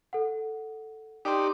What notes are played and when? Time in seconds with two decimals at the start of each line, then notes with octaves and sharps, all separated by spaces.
0.13 A4 F#5
1.25 D#4 G4 A#4 C5 D5